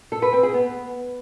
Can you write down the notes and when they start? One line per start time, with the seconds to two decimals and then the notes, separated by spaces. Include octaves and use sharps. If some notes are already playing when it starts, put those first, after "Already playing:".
0.12 A4
0.22 B4
0.33 C4
0.43 G#4
0.54 B3